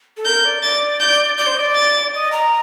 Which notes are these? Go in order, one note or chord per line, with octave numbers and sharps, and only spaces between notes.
A4
A#4 G6
D5
D5 A6
G6
D5 G6
C5
D#5
D5
A6
D#5
A#5